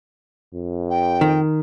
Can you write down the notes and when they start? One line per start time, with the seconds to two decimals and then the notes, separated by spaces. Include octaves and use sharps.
0.54 F2
0.90 G5
1.21 D#3